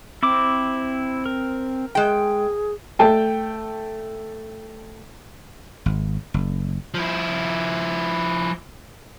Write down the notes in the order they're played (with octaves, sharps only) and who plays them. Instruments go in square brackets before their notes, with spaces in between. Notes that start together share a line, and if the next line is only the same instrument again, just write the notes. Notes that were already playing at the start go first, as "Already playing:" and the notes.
[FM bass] C4 [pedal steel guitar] E4 D6
[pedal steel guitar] A#4
[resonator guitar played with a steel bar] G#3 G5 [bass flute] G#4
[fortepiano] A3 G5 A5
[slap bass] G#1
F#1
[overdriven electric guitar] F3 E4